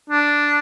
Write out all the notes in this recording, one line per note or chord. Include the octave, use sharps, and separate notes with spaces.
D4